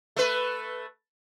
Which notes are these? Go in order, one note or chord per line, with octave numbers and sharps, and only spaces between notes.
A3 B4